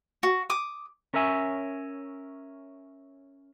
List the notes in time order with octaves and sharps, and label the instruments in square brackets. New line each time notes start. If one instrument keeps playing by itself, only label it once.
[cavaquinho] F#4
D6 D#6
[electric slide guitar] C#4 A#4 C#5 E5 G#5